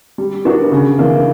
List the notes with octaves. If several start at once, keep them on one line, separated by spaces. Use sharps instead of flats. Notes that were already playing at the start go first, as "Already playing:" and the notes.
G3
B3 D4 F#4 A#4
C#3
E3 A#3 D4